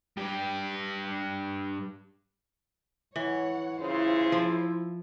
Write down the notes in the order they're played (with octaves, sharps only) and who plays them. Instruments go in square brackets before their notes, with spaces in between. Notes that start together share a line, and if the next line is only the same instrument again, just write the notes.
[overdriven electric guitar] G2 G4
[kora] E3 [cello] C#5 F#5
[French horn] C#3 [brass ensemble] E4 [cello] F4 C5
[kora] F3